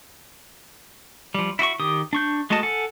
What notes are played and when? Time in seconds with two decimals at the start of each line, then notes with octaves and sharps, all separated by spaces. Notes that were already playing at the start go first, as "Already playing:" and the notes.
1.34 F3 G3
1.59 E4 F#4 D#5 C#6
1.80 D#3 G4 D#6
2.13 D4 C#6 G6
2.50 G#3 A3 F#4 D#5 A5
2.63 A4 F#5 G#5